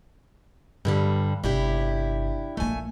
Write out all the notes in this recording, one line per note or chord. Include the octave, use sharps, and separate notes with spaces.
G2 D3 G3
G1 C3 D4 E4 G4
A#1 A3 A#3 G#5